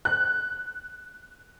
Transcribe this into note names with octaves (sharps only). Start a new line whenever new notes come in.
F#6